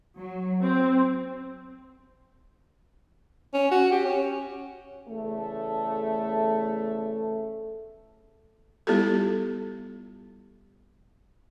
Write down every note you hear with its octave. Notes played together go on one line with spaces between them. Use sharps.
F#3
C4
C#4
F#4
G4
C#4
E2 C#3 A3
G3 B3 E4 F4 G4 A4